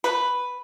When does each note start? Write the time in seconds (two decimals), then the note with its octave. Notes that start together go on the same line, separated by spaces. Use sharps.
0.04 B4